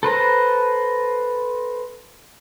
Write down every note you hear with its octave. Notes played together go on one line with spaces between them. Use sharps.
A4 B4 C5 A#5